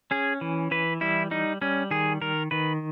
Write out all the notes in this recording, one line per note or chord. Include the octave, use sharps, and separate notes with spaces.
C#4 G#4
E3
E3 B4
G3 E4
G3 D#4
G3 C#4
D#3 G#4
D#3 A#4
D#3 B4